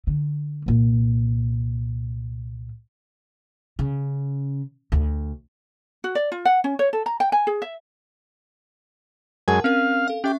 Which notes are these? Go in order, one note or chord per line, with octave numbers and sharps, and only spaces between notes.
D3
C2 A#2
C#3
D2
F#4
D5
F4
F#5
C#4
C#5
A4
A#5
G5
G#5
G#4
E5
F#2 G#3 A#4 F#5 G#5 A5
C4 C#4 A#4 F5
A4 F5
C#4 G4 E5 C#6